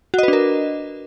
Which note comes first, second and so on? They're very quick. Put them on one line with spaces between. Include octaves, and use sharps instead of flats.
F#4 D#5 B4 D4 A#4